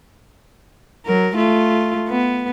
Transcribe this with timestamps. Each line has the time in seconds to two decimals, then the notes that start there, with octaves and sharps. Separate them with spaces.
1.06 F#3 A#4
1.36 A3 F4
2.09 B3